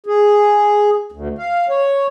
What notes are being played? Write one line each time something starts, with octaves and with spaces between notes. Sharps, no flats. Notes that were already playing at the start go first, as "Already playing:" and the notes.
G#4
D2
F5
C#5